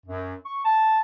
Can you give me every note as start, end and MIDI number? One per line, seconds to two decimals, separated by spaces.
0.06 0.35 42
0.46 0.64 85
0.65 1.01 81